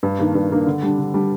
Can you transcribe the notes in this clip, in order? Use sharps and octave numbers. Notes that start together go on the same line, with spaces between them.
G2
D#3 A#3 D4
G2
D#3 A#3 D4
D3
G3 D4
D3
G3 D4